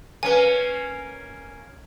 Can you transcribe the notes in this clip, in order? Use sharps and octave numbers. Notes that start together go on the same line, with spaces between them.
A#3 C#4 B4 G#5